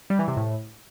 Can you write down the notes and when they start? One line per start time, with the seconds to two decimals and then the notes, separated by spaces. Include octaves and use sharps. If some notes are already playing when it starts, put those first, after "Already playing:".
0.10 G3
0.19 E3
0.28 C3
0.37 A2